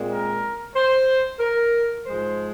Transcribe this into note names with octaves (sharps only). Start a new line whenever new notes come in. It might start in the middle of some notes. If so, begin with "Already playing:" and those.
Already playing: A#2 G#3 C4
A#4
C5
A#4
G#2 F3 G#3 C5